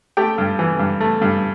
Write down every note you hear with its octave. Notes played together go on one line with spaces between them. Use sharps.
A3 G4 G5
G2
E3
G2
A3
G2